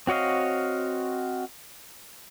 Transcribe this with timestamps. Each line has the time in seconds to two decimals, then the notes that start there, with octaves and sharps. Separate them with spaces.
0.07 C4 F#4 C#5 D#5 F5